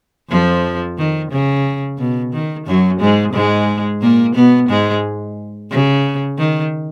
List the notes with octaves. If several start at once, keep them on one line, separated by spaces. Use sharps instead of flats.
F2 F3
D#3
C#3
B2
D#3
F#2 F#3
G#2 G#3
G#2 G#3
A#2 A#3
B2 B3
G#2 G#3
C#3
D#3